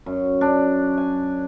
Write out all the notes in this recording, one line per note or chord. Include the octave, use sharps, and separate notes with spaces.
F#2
D4
G#5